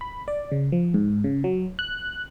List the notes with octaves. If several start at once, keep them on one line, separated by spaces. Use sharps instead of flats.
B5
D5
C#3
F3
G#2
C#3
F#3
F#6